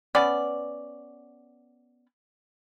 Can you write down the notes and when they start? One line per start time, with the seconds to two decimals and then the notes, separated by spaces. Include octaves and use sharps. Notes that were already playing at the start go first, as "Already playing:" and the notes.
0.15 B3 C#4 D5